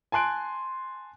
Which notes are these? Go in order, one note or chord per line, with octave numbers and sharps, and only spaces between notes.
G#5 A5 C6 F#6 D7